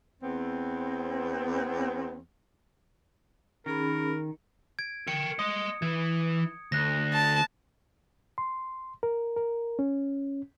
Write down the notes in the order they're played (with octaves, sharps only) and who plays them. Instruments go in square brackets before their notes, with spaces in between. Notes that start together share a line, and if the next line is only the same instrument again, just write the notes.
[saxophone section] E2 B3 C4
[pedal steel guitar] D#3 [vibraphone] C#4 G#4 B5 [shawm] A#4
[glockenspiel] G#6 D7
[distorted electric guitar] A#4 G5 [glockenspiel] C#7
[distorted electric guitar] D#5 C6 [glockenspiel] D#6
[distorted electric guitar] E3 [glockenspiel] G#6
[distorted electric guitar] D2 [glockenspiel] F#6 A#6
[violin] A5
[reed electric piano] C6
A#4
A#4
C#4